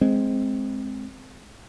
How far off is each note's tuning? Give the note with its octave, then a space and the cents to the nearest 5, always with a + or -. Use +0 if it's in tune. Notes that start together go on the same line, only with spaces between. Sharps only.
G#3 +15 C4 +0